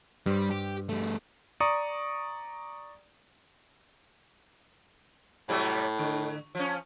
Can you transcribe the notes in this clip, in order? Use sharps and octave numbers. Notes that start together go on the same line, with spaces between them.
G2 G3 C5
G4
G3 A3
D5 A#5 C#6 D#6 C#7
A2 C3 F#3 G3
D3
F3 C#4